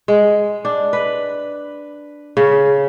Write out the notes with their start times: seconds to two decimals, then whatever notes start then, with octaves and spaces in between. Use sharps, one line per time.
0.08 G#3
0.65 D4
0.93 B4
2.37 C#3